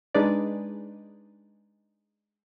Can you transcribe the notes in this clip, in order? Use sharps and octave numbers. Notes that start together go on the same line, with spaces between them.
G#3 D4 D#4 G#4 B4 D5